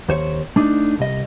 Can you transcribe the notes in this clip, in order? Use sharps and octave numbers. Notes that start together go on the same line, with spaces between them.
D#2 C5 C#5
A3 D4 D#4
C2 D#5